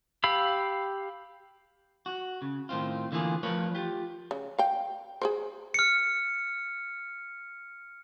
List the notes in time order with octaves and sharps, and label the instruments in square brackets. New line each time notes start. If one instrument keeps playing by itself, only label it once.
[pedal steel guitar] G4 F5 B5 E6
[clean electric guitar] F#4
C#3
A2 D#3 C4 F4
D3 E3 A#3 F4 G#4
F3 A3 A#4 B4 C#5 F5
F4 G4
[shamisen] C#3
F5 G5
G#4 A#4 C5
[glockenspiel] F6 C#7